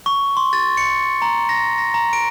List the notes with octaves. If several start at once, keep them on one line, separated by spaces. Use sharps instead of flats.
C#6
C6
A6
C#7
A#5
A#6
A#6
A#5
D7